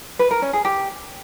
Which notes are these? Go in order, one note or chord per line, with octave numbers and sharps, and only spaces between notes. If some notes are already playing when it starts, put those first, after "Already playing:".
B4
A#4
C#4
G#4
G4